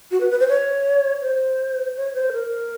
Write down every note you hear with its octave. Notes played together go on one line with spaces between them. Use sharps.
F#4
B4
B4
C5
C#5
C5
C#5
C5
A#4